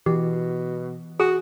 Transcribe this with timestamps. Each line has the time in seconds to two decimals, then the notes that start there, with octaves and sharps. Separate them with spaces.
0.06 B2 E3 G4
1.20 F#4 G#4